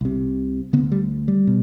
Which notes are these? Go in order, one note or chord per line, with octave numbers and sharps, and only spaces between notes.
C2 C3
D2 D3 B3
G3
G3
B2